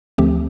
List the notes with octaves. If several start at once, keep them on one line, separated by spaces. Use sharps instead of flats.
D2 D3 F3 A3 C4 G4